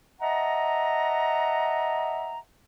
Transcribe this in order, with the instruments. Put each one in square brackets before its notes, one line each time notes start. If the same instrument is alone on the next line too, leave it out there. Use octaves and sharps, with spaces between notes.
[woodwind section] D#5 E5 F#5 A5 A#5